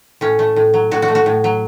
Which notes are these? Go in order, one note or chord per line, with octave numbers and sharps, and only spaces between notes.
A2 C#4
A3
A2
F#3
A2 F#4
F#4
A3
F#4
A2
F#3